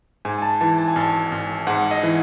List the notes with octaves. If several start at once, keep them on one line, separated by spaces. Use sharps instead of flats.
G#2 G#5
G#5
A5
E3 A5
A5
G#5
G#1 A5
G#1
G#2 F#5
D#5
E3